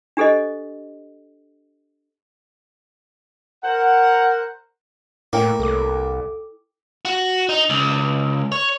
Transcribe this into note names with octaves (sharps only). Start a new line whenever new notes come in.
D4 G4 A4 C5 D#5
A#4 C5 F#5
A2 A3 A#3 E4 C#5 G5 G#5
C2 A4 D6
F#4
D#4
C#2
C#5